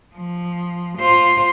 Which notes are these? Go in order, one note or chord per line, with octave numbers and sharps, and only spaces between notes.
F3
F4 C5